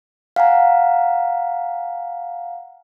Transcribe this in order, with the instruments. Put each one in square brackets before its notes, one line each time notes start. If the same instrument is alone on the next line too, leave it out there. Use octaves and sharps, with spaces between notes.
[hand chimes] F5 F#5 G#5 A#5